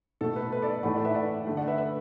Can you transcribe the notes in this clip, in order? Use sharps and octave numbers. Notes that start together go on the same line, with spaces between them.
B2 A3 A4
B4
B4
A4 D5
A4 D5
A2 E3 A3 F#5 B5
A4 D5
B4 E5
D5 F#5
D3 A3
D5 F#5
B4 E5
B4 E5